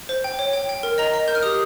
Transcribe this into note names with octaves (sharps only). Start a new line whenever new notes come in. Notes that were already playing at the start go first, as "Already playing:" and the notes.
C5
G5
C#5
G5
G5
A#4
D#5 A#5
D#5
A#4 G6
F6
G4 D#6